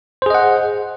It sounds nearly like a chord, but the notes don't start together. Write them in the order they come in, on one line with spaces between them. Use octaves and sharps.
C5 G#4 D#5 F#5